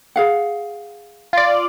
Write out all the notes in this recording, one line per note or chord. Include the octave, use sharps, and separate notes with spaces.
G#4 F5 F#5
F4 D5